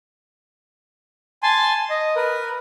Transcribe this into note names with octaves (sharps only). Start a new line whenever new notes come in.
G#5 A5 C6
D#5
A#4 B4